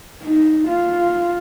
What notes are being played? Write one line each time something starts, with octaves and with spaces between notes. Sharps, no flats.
D#4
F4